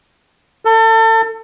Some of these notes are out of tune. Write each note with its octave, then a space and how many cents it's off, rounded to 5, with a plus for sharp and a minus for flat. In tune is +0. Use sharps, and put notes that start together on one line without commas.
A4 +30